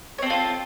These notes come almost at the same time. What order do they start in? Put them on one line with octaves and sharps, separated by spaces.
C#5 C4 A4 F4